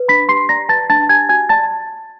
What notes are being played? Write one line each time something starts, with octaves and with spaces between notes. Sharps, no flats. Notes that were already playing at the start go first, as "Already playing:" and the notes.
Already playing: B4
D4 B5 B6
G4 C6 C7
D5 A#5 A#6
B4 A5 A6
D4 A5 A6
G4 G#5 G#6
F#4 G#5 G#6
D5 A5 A6